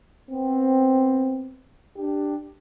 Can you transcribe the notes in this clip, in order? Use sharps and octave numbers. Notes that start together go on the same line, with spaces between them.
B3 C4
D4 G4